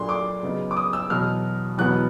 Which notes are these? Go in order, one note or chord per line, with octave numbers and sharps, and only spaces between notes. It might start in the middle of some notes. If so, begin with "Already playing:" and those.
Already playing: A#2 F#3 A3 D4 C6
D6
C#3 F#3 B3 D#4
D6
D#6
E6
E2 B2 F#3 F6
E2 B2 F#3 B3 F#6